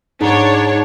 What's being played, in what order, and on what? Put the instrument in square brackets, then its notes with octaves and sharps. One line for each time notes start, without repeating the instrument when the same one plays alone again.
[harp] G#2 [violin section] D4 C#5 [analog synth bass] D#4